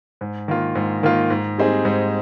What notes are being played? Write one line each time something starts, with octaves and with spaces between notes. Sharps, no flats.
G#2
D#3 A#3 F4
G#2
D#3 A#3 F4
G#2
G3 C4 D#4 G#4
G#2